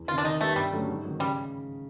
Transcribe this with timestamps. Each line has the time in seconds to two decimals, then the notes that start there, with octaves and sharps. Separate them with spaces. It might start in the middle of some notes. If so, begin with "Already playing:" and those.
Already playing: E2
0.08 C3 D#3 F4
0.18 D4
0.24 D#3 D#4
0.41 G3 A3 B3
0.56 G2 G3
0.72 D3 F#3 A3 C#4
0.87 G#2
1.03 F#3
1.08 D#3
1.19 C#3 G3